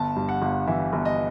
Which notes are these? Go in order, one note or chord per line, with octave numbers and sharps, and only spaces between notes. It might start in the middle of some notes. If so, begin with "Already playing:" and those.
Already playing: G1 A5
G2
F#5
G1
E3 E5
G1
D#5